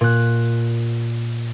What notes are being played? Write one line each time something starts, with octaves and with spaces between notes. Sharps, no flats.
A#2 F#6